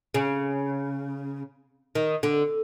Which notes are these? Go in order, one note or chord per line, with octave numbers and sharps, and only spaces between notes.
C#3
D#3
D3